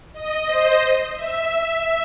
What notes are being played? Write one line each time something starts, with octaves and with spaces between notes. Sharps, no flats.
D#5
C5
D#5
E5